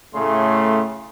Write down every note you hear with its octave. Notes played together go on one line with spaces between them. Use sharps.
A2 C#3 A3 C6